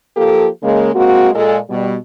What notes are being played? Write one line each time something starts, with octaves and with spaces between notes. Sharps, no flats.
F3 A#3 G4 A4
C#3 G#3 A#3
G#3 A#3 C4 F#4
A#2 G#3 A4
B2 G3